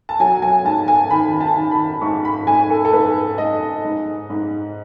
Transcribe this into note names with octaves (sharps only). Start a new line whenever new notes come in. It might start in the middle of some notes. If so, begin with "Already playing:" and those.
A5
F#3 G#5
G#5
G#2 A5
G#5
D#3 B5
A5
D#3
B5
G#2 C#6
B5
G#2 G#5
A4
A4
G#2 B4
G#2 D#5
G#2
G#2